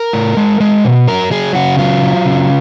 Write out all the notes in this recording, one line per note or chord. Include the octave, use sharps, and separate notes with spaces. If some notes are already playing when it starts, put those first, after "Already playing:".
Already playing: A#4
A2
G#3
G#3
B2
F#3 A#4
F#3 G#4
C#3 F#4
F#3 F4
F#3
C#3